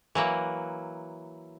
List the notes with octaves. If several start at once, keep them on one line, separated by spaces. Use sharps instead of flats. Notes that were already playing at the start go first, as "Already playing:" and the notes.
E3 F#3 A#3